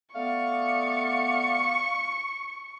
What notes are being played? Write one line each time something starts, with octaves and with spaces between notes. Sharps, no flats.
A3 B3 D5 F5 C#6